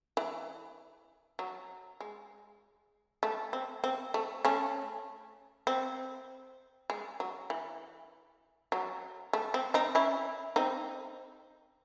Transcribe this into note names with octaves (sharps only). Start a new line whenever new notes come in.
E3
F#3
G#3
A3
C4
C4
A3
A3 C#4
C4
G#3
F#3
E3
F#3
A3
C4
C4 D#4
C#4 E4
C4 D#4